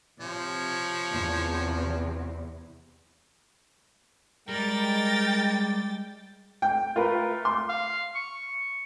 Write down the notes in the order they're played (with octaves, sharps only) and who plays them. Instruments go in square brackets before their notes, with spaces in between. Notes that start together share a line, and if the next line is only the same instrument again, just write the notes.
[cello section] C3 [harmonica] F3 [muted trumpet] C#5
[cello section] E2 C3
[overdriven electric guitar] G3 [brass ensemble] G#3 [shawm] A#4 [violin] G5 A6
[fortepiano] G5
[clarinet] A3 [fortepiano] F4 A#4 B4
[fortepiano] C6
[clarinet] F5
C#6